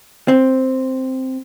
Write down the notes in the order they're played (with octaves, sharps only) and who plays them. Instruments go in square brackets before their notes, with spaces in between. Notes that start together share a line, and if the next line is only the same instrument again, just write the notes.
[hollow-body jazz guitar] C4